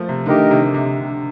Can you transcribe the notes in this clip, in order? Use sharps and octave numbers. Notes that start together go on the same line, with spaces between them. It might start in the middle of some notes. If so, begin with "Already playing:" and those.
Already playing: F3 A3 A#3
C3
D3 D#3 A3 D#4 G4 A#4
C3
C3
D3